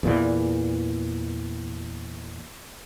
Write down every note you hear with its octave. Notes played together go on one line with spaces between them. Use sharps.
E2 A#2 E3